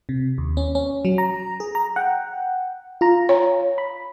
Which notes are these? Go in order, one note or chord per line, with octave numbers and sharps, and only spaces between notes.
C3
D#2
C#4
C#4
F#3
A#5
G#4
A#5
F#5 G5
F4 A#5
C#5
B5